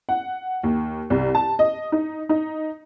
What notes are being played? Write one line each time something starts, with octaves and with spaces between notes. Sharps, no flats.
F#5
D#2
C2
A5
D#5
D#4
D#4